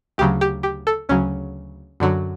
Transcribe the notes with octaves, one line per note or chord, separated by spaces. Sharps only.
D2 C#3 F#3 G4
G4
G4
A4
D2 C#3 F#3 C#4
F#2 D3 F#3